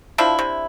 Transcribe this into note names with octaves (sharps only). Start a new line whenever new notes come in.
F3 D4 E4
C3